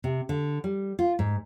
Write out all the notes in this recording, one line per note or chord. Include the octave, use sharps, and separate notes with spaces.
C3
D3
G3
F4
G#2